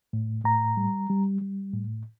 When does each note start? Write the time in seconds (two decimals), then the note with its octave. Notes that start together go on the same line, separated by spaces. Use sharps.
0.13 A2
0.44 A2 A#5
0.77 G3
1.10 G3
1.41 G3
1.73 A2